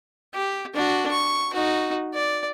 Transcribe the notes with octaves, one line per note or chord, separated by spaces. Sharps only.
G4
D4 F#4
C#6
D#4 F#4
D5